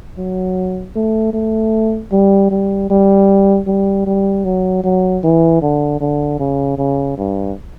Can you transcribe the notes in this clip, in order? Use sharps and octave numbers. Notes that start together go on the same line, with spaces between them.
F#3
A3
A3
G3
G3
G3
G3
G3
F#3
F#3
E3
D3
D3
C#3
C#3
G2